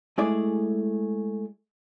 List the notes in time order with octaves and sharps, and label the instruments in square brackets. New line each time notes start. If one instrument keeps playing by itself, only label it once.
[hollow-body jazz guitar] G#3 A3 E4 G#4 D5